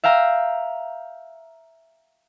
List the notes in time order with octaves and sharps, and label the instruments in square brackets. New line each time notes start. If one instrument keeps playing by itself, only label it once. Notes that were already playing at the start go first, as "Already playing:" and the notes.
[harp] E5 F5 G5 A#5